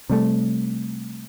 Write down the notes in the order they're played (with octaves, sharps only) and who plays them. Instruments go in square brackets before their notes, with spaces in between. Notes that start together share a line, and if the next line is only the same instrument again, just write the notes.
[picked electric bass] C3 G3 A3